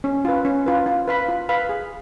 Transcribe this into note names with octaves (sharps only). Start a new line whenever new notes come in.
C#4
F4 B4
C#4
F4 B4
F4
B4 F5 B5
F4
B4 F5 B5
G#4